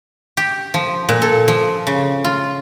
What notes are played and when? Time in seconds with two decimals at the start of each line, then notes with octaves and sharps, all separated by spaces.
0.37 G4
0.74 F3
1.09 A#2
1.22 A4
1.48 F3
1.87 C#3
2.24 F4